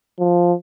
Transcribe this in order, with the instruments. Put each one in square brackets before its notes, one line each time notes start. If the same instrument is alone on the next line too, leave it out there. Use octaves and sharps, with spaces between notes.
[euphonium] F3